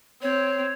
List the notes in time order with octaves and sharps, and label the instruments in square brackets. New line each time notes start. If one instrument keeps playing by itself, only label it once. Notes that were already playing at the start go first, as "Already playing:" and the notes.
[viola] C4 [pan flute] C#5